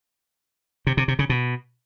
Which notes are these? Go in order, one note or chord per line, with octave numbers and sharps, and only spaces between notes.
C3
C3
C3
C#3
B2